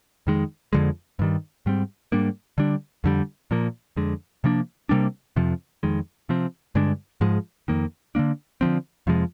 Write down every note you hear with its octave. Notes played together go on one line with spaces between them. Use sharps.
F2 D#3 G#3
F2 D3 F3 G#3
G2 D#3 G3
G#2 G3 C4
G#2 G3 A#3 D4
D3 G3 D4
F2 D3 G3
A#2 F3 A#3
F2 D3 G#3
C3 F3 A#3 D4
C3 G3 A#3 D4
F2 C3 F3
F2 D#3 G#3
C3 F3 C4
G2 D3 G#3 D4
G#2 F3 G#3
F2 D#3 A#3
D3 F3 A#3 D4
D3 F3 C4
F2 C3 F3 G#3